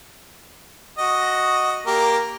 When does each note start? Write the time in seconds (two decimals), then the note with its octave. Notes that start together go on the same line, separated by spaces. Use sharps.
0.98 F#4 D#5
1.87 A#3 G4 A#4